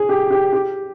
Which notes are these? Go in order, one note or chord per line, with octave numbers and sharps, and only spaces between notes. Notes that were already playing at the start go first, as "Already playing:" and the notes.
Already playing: G#4
G4
G4
G4